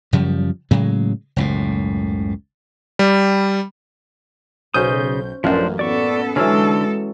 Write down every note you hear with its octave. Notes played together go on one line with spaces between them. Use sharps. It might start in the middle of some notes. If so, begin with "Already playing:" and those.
F#2 C#3 F3 G3
A2 C#3 F#3 G#3
F#1 C#2 A2
G3
B1 C#3 C#4 C5 D#6 G6
A1 F#2 F3 A#3 D4 C5
B3 A4 D5 C#6
D3 E3 F#3 G#3 C#4 D4 A4 E6